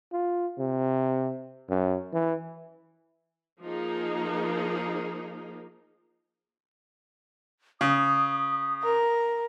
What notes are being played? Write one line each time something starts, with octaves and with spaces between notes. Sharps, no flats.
F4
C3
F#2
E3
F3 A#3 D#4 G#4
C#3 D#6
A#4 A#5